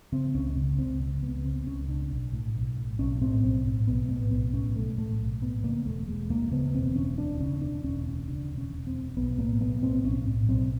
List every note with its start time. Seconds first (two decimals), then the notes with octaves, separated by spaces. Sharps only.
0.12 C#3 C4
0.34 C#2 C#4
0.56 C#3
0.78 C#2 C4
1.00 C#3
1.22 C#2 B3
1.45 C#3 C4
1.66 C#2 C#4
1.88 C#3 D4
2.11 B1
2.33 A2
2.55 B1
2.77 A2
2.99 B1 C#4
3.21 A2 C4
3.43 B1 C4
3.65 A2
3.87 B1 B3
4.09 A2 B3
4.31 B1 B3
4.54 A2 C#4
4.75 B1 A3
4.97 A2 A3
5.20 B1
5.41 A2 B3
5.64 C#3 A#3
5.86 E1 A3
6.08 E1 G#3
6.30 D2 A#3
6.52 C#3 B3
6.74 E1 C4
6.96 E1 C#4
7.18 D2 D4
7.40 C#3 C#4
7.62 E1 D4
7.84 E1 C#4
8.07 D2 C#4
8.28 C#3 D4
8.50 E1
8.58 C#4
8.73 E1
8.87 C4
8.95 D2
9.17 B1 B3
9.38 A2 A#3
9.60 B1 B3
9.83 A2 C4
10.05 B1 C#4
10.27 A2
10.49 B1 C4